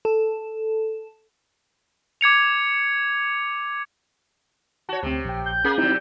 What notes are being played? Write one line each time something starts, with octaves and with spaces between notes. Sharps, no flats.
A4
D6 G#6 C#7 F7
F#4 C#5 A5
D2 C3 C4
A#1 G5
G6
A#3 C#4 G#4
C3 F#3 C4 D#4 E4